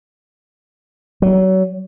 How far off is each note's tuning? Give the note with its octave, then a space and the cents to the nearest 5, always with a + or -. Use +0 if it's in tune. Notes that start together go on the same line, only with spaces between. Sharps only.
F#3 +30